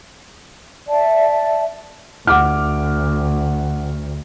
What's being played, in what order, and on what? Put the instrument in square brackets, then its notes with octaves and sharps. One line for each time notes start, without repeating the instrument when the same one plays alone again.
[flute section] D5 E5 A5
[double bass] D2 [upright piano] F#5 D6 F6